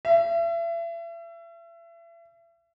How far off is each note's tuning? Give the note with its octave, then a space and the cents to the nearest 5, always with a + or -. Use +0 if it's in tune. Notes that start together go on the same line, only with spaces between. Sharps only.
E5 +35